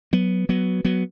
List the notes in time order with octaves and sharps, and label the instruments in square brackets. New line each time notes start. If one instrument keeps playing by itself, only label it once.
[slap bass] F#3 B3
F#3 B3
F#3 B3